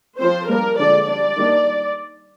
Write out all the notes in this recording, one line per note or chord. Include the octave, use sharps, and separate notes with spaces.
F3 C4 C5
G3 A#3 D4 A#4
D3 F3 G#3 D4 D5
G3 D4 D5
D#3 G3 A#3 D4